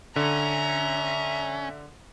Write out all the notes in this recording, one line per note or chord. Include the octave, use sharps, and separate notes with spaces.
D3 C#4 E5 A#5